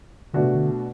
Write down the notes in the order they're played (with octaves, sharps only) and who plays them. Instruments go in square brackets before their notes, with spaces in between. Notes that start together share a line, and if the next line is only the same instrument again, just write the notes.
[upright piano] B2 A3 D4 F#4 [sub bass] D3
[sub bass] C3
D3